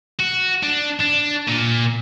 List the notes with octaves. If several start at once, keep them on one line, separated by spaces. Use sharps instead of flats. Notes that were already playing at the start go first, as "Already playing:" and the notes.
F#4
D4
D4
A#2